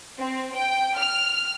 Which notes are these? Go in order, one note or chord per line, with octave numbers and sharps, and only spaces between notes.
C4
G5
F6